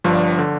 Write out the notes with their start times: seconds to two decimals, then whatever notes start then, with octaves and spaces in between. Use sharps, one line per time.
0.04 G1 G2 F3 D4
0.39 D3